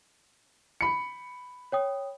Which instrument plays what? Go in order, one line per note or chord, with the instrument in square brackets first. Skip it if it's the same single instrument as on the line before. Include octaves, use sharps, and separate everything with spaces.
[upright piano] B5 C#7
[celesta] C#5 G5 D#6